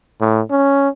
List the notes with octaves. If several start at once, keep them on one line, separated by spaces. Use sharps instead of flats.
A2
C#4